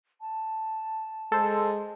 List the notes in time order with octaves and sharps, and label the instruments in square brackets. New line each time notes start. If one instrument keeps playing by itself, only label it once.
[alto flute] A5
[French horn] G#3 [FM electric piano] A4 C5